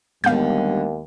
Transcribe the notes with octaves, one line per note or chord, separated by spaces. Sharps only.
D#2 D3 G3 G#3 B3 F5 G6